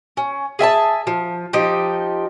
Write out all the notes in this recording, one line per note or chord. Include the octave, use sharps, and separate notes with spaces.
C#4
G#4 E5 G#5 A5
F3
F3 D#4 G4